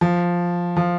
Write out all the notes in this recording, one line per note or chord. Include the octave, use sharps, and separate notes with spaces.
F3
F3